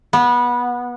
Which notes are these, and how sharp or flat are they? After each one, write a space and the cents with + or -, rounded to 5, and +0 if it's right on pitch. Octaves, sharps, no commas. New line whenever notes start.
B3 -20